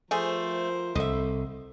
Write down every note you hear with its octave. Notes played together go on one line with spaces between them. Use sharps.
F3 A3 G#4 A#4 C5
C2 A4 D#5 E5